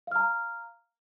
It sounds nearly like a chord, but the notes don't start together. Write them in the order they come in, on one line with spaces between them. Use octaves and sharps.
F5 F6 A#5